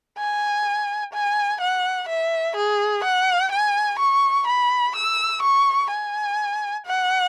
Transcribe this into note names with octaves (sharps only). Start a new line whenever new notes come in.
G#5
G#5
F#5
E5
G#4
F#5
G#5
C#6
B5
E6
C#6
G#5
F#5